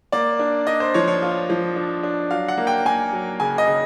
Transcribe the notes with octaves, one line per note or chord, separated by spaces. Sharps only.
A#3 D5
D4
D4 D#5
C5
F3 C#5
C#5
F4
F3
D4
D4
F#3 F5
F#5
A#3
G5
A#3 G#5
F#3
C#3 G#5
D#5
C#3